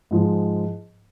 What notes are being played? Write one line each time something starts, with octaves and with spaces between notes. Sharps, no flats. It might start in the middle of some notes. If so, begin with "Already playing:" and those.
G#2 F3 G#3